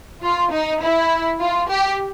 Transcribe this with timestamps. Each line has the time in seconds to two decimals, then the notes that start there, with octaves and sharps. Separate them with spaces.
0.23 F4
0.52 D#4
0.82 E4
1.40 F4
1.69 G4